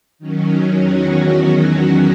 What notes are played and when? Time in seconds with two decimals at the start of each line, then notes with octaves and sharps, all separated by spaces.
0.19 D#3 F#3 C#4
0.72 E2 D#3 F#3 C#4 F#4